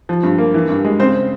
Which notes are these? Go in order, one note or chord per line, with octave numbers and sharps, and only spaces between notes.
F3
G2
A#3
E3
G2
G#3
C#3 C4 C5